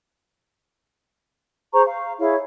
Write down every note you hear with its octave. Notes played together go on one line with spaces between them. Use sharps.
G#4 C5 A#5 C#6
F5
E4 G#4 C#5 F5